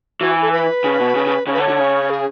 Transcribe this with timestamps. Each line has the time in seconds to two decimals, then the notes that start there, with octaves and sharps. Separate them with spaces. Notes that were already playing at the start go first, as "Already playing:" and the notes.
0.20 E3 F#4
0.42 A4
0.52 B4
0.84 C#3
1.00 B2
1.15 C#3
1.26 C#3
1.47 C#3 C#5
1.53 B4
1.57 D3
1.61 C#5
1.68 D3
1.79 C#3
2.10 G#4